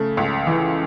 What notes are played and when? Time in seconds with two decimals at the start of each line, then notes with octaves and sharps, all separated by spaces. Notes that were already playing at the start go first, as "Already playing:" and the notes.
Already playing: C#3 A3
0.17 C#2
0.47 E3